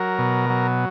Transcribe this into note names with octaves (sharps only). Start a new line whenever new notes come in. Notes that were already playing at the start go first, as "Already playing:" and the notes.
Already playing: F#3 A#4
B2
F#3